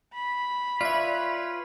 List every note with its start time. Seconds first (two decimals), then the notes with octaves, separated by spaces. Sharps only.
0.14 B5
0.81 F4 B4 C#5 D5 E5